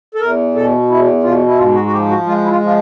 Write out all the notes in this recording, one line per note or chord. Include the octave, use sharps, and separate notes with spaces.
A4
E2 A#4
B2 A4
E2 E4
B2 F4
E4
G#2 F4
F#4
F#4
F3 G4
F#4
G#3 F4
E4
F4
F3 F4